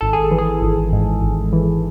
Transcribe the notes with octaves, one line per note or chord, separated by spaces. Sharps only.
G#1 A4
G#4
E3
G#4
G#1
G#2
G#1
E3